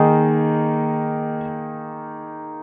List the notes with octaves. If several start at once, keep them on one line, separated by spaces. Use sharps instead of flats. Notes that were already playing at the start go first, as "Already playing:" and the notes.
Already playing: D#3 A#3 D#4 G#4